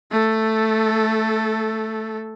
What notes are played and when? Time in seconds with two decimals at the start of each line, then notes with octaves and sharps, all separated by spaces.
0.12 A3 A4